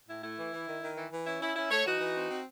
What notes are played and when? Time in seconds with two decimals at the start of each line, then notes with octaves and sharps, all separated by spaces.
0.09 A2 E4
0.23 A3 E4
0.38 E3
0.53 E3
0.67 D#3
0.83 D#3
0.97 E3
1.12 E3
1.26 C#4 E4
1.41 C#4 E4
1.56 C#4 E4
1.71 A3 A4 C#5
1.85 E3 D#4 F#4
2.01 E3
2.16 C4
2.31 C4